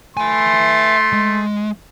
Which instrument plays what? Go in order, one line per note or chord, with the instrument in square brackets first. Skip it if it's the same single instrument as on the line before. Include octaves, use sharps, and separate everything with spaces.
[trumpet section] A3 C6 [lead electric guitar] E5 G#5
[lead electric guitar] G#3